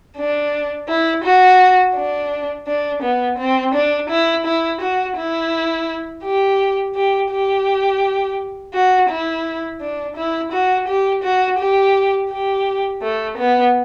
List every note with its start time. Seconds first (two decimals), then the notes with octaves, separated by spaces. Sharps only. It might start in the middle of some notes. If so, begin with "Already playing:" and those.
0.17 D4
0.88 E4
1.24 F#4
1.95 D4
2.67 D4
3.03 B3
3.38 C4
3.74 D4
4.10 E4
4.45 E4
4.81 F#4
5.17 E4
6.24 G4
6.95 G4
7.31 G4
8.74 F#4
9.09 E4
9.81 D4
10.16 E4
10.52 F#4
10.87 G4
11.23 F#4
11.59 G4
12.31 G4
13.02 A3
13.37 B3